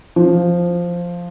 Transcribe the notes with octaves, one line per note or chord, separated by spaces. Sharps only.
F3